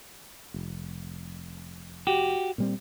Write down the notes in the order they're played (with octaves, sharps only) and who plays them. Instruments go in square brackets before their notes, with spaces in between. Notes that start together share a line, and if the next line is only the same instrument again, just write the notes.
[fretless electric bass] F1
[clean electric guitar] F#4 G4
[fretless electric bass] A#2 G3 C4